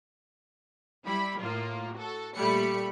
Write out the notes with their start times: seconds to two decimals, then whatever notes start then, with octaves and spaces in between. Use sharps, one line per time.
1.05 G3 E4 B5
1.41 A2 A#3 F4
1.95 F#4 A4
2.36 A#2 G3 A3 B5 C#7